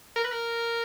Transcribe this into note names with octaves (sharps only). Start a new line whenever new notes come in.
A#4
B4
A#4